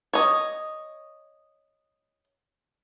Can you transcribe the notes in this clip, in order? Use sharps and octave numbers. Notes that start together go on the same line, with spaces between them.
C#5 D#5